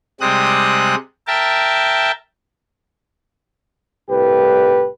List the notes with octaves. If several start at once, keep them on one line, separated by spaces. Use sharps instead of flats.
C3 G3 G#3 C4 D#6 F#6
A#4 E5 G5 A5
C2 A2 G4 B4